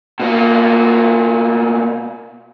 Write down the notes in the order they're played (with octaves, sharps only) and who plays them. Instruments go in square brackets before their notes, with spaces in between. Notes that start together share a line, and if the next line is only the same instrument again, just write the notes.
[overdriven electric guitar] B2 A#3